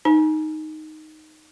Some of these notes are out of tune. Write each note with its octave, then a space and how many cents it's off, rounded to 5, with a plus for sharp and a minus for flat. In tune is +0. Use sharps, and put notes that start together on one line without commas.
D#4 +0 G#5 +30